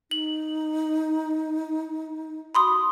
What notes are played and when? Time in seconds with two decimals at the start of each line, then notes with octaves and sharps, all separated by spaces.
0.11 D#4 F#7
2.55 F#4 B5 C6 D#6